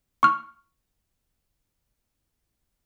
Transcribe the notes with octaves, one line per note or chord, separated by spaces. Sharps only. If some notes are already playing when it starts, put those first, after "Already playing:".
C#6 F6